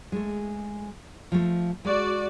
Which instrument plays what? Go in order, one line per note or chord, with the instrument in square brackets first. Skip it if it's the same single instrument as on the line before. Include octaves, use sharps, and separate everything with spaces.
[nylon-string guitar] G#3 A3
F3 A3
[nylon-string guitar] G#3 [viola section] F#4 D5